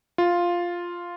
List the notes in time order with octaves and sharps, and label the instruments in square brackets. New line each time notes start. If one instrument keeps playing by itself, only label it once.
[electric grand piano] F4